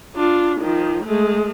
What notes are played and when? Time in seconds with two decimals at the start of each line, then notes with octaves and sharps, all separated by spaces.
0.15 D4 F4
0.60 D#3 F3
1.04 G#3 A3